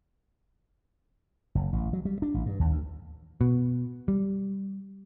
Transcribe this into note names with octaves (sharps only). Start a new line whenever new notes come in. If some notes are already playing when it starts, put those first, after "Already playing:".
F#1
A1
F#3
G3
D4
A1
G2
D#2
D2
B2
G3